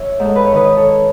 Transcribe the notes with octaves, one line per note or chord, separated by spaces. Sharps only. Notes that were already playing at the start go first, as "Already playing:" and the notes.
Already playing: C#5 E5
G#2
A4
B4
C#5
D#3 B4 D#5
A4 C#5